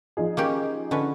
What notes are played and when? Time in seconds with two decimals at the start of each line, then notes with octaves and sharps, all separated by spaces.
0.17 F3 D#4 G#4
0.37 A#3 C#4 G4
0.91 D3 C#4 B4